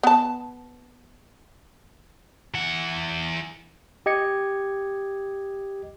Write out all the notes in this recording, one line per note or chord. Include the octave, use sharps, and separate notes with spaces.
B3 A5
E3 F#5
G4 D#5 G#6 C#7